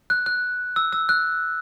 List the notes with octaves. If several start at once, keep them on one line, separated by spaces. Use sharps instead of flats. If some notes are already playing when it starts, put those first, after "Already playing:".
F#6
F#6
E6
E6
F#6